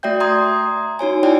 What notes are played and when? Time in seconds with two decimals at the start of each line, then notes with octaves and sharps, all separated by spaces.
0.03 A3 F#4 D5 E5 G5 G6
0.20 A#5 C6 D#6 G#6
0.99 D#4 F#4 C#5 G#5
1.23 D#4 E4 C#5 D5 G5 G#5